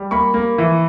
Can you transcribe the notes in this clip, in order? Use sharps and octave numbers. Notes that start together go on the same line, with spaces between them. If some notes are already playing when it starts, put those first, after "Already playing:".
Already playing: G3
A#3 B5 C#6
A#3
E3